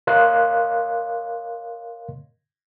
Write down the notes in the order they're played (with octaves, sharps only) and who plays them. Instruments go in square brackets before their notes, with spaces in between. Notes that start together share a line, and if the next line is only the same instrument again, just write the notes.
[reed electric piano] A#4 C#5 D#5 F5 C6 F#6